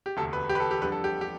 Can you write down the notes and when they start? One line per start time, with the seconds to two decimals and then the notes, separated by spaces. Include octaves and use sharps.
0.06 G4
0.17 E1 D2 C3 A4
0.33 B4
0.49 G4
0.55 B4
0.60 A4
0.71 G4
0.82 F2 D3 G3 B4
0.92 A4
1.04 G4
1.21 G4